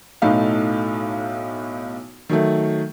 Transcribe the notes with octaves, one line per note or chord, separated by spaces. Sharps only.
B1 A2 A3 D#4 F5
D#3 F#3 A3